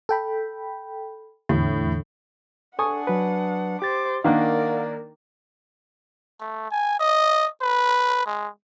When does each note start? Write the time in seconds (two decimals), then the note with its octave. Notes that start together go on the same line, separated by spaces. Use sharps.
0.09 A4 G5 B5
1.49 E2 A2 D3
2.79 D4 A4 F#5 G#5 C#6 D#6
3.07 F#3 B4
3.82 G4 C5 D6 A6
4.24 D#3 A#3 D4 A#4 D5 F5 F#5
6.40 A3
6.71 G#5
6.99 D#5
7.61 B4
8.26 G#3